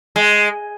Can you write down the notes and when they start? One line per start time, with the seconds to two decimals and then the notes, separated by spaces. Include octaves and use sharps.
0.16 G#3